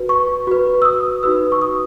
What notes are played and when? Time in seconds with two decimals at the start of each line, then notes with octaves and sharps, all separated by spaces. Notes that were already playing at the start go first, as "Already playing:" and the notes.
Already playing: F#4 B4
0.09 C#6
0.47 F#4 B4
0.82 E6
0.85 D#6
1.23 D#4 F#4 B4 E6
1.52 C#6
1.62 D#6